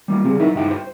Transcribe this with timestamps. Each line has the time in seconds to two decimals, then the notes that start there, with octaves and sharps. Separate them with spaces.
0.08 G3 A#3 F4
0.24 C#3 G3 C4 G#4
0.39 F#3 D#4 E4 A#4 E5
0.54 C#2 G2 D#4 E4 F#4 G5
0.71 C5